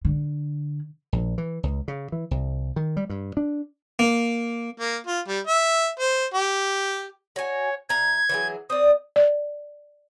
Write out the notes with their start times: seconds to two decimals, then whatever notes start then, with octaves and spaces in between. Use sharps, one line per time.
0.05 D3
1.13 A#1
1.38 E3
1.63 C#2
1.88 C#3
2.12 E3
2.31 C2
2.76 D#3
2.97 G3
3.10 G2
3.37 D4
3.99 A#3
4.79 A#3
5.07 F4
5.28 G3
5.47 E5
6.00 C5
6.34 G4
7.36 F#4 C#5 G#5
7.89 C3 A#5 G#6
8.29 E3 F#3 G#4
8.70 C4 D5 D#6
9.16 D5